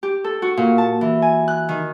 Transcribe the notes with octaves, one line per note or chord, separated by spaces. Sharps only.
G4
A4
F#4
A#2
A5
E3
G#5
F#6
D#3